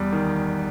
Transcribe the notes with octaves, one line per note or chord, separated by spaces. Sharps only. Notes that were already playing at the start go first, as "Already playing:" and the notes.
Already playing: E2 G3
D#3